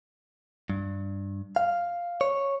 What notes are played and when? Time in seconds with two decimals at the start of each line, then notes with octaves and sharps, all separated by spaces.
0.70 G2
1.56 F5
2.21 C#5